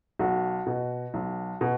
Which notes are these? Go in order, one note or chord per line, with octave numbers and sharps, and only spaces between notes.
B1 F#4
B2
B1
B2